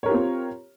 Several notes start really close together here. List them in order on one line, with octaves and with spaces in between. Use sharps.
C#5 A#4 G4 F4 C4